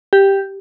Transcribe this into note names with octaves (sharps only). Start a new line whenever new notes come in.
G4